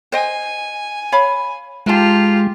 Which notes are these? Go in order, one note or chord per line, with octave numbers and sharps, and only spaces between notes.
C5 D#5 G#5
C#5 F5 B5
G#3 D#4 F4 G4 A5